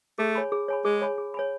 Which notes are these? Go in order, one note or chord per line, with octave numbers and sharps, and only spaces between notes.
A3 G#4
C#5 G#5 B5
G#4
C#5 G#5 B5
G#3 G#4
C#5 G#5 B5
G#4
C#5 G#5 B5